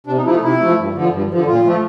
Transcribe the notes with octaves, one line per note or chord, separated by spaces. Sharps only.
C3 D4
D#4
F3 A3 E4
D#4
C3 E4
F3 A3
G2
D3 F3
G2
D3 F3
A#2 F4
F3 A3